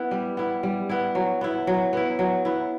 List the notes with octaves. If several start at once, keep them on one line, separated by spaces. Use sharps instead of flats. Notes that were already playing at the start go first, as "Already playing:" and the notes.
Already playing: B3 E4
G3
B3 E4
G3
B3 E4
F#3
B3 E4
F#3
B3 E4
F#3
B3 E4